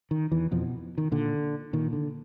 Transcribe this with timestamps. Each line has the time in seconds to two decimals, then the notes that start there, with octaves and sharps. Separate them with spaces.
0.11 D#3
0.32 E2 E3
0.51 F2 B2 F3
0.98 D#3
1.12 A#2 D3
1.73 A#2 D#3
1.93 D3